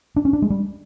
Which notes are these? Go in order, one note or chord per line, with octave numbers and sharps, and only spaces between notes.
D4
C#4
D4
G#3
G3